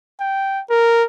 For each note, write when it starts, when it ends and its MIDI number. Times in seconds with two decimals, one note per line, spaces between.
0.20 0.62 79
0.70 1.04 70